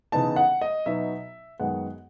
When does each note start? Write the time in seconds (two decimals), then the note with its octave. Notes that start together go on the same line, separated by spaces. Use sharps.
0.12 C#3 E3 B3 D#4 A5
0.36 F#5
0.61 D#5
0.86 B2 F#3 B3 D#4 E5
1.60 F#2 D#3 G#3 B3 F#5